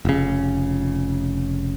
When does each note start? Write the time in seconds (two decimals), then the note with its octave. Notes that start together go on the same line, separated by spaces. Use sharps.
0.05 F1 C#3